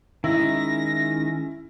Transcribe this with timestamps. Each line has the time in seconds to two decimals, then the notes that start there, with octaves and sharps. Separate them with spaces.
0.24 D#3 G#3 C#4 E4 A#6